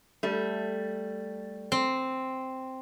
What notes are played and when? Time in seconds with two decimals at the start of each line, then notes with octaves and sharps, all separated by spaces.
0.23 G3 A3
1.72 C4